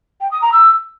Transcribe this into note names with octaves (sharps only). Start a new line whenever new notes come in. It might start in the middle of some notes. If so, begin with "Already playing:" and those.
G5
D#6
A#5
E6